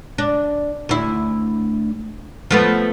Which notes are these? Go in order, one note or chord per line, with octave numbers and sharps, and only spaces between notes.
D4
D2 E4
F3 A3 B3